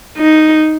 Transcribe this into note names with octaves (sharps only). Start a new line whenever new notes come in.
D#4